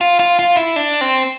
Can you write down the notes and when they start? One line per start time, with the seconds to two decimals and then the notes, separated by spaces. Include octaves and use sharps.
0.01 F4
0.20 F4
0.39 F4
0.57 E4
0.76 D4
1.01 C4